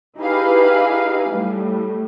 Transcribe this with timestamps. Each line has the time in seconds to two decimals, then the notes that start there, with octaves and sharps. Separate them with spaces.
0.18 D#4 E4 G4 G#4 B4 F5
1.30 A2 G3